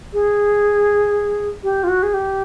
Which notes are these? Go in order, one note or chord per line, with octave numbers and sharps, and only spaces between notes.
G#4
G4
F4
F#4
G#4
G4